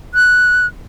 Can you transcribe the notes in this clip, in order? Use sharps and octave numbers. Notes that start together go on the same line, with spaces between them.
F#6